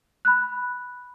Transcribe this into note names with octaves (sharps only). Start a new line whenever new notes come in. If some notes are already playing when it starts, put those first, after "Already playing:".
B5 F#6